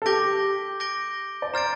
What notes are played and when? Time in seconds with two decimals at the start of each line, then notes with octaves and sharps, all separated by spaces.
0.02 A4
0.06 G4 D6 G6 A#6 D7 G7
0.80 D6 G6 A#6 D7 G7
1.42 D5
1.54 C5 A#5 F6 A6 D7